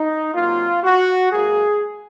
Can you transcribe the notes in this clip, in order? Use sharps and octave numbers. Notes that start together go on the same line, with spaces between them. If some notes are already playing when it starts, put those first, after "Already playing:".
Already playing: D#4
C3 F#3 A#3 F4
F#4
G#2 F#3 A#3 G#4